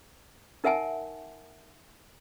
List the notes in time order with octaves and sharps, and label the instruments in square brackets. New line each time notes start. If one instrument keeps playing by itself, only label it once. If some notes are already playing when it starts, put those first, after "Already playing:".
[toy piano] D#4 A#4 E5 F#5 G#5 A5